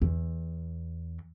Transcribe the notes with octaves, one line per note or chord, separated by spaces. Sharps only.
E2